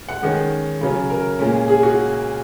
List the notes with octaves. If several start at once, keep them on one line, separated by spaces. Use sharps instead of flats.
F#5
D#3 G#3 C#4
C#3 F#3 C#4
A#4
A#2 G#3 C#4
G#4
F#4